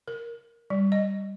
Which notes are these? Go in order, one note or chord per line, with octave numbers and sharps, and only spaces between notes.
A#4
G3
D#5